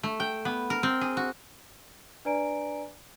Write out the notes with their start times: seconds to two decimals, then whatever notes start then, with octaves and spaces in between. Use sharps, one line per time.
0.03 A3
0.20 G5
0.45 B3
0.70 A#4
0.83 C4
1.01 G#4
1.17 F#4
2.25 D4 B4 D5 G#5 A#5 D7